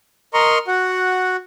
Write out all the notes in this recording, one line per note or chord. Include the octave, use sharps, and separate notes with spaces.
A#4 D#5 A#5 C6 C#6
F#4 F#5